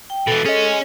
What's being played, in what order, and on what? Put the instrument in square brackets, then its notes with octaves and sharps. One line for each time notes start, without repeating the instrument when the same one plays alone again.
[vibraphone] G5
[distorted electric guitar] B2 E3 [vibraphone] A4
[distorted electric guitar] C#4 [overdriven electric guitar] G#4 D#5